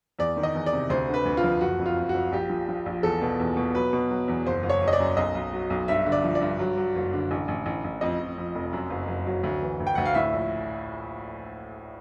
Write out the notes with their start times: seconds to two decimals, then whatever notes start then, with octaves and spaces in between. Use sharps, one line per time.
0.19 E2 D5
0.37 D#3
0.43 D#5
0.55 E2
0.66 D5
0.73 C3
0.90 D2 C5
1.08 D3
1.14 B4
1.25 D2
1.37 F4
1.44 F3
1.61 F#1 F#4
1.79 F2
1.86 F4
1.96 F2
2.09 F#4
2.14 F2
2.32 A#1 G4
2.50 F3
2.69 F3
2.86 A#1
3.03 E2 A4
3.21 B2
3.40 E2
3.57 B2
3.75 F#3 B4
3.93 B2
4.11 F#3
4.28 E2
4.46 F#1 C5
4.63 F#1
4.70 C#5
4.82 F#1
4.88 D#5
4.93 D5
5.00 F#2
5.17 B1 D#5
5.35 B1
5.53 F#3
5.70 B1
5.88 G2 E5
6.06 D3
6.12 D5
6.24 F3
6.35 D5
6.41 G2
6.59 F#3
6.77 F#3
6.95 F#1
7.13 D3
7.31 A1
7.48 A1
7.66 A1
7.84 A1
8.01 F2 D#5
8.20 F2
8.38 F2
8.55 F1
8.73 F#2
8.90 F#1
9.08 F#1
9.27 F#3
9.43 D2
9.62 E3
9.80 D2
9.87 G5
9.95 D2 F#5
10.05 F5
10.15 A2 E5
10.33 A#1